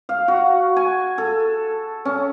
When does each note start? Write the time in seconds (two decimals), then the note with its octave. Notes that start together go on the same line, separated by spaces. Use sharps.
0.09 F5
0.28 F#4
0.76 G#5
1.18 A4
2.05 C#4